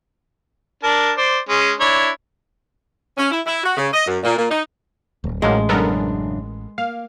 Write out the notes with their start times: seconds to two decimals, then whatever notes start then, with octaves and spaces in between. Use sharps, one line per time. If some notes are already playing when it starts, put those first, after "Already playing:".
0.83 D4 A#4 A5
1.17 C5 D5
1.49 G#3 C#4
1.80 D4 E4 C#5
3.17 C#4
3.31 E4
3.46 E4
3.64 F#4
3.77 C#3
3.93 D#5
4.06 F#2
4.23 A#2
4.37 A#2
4.50 D#4
5.24 D1
5.42 A1 A2 F3 F#3 G#3 A#3
5.69 F#2 C#3 B3 D4 A4 A#4
6.78 A#3 F5